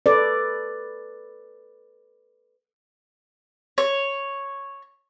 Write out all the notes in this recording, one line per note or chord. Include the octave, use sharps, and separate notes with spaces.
A4 B4 D5
C#5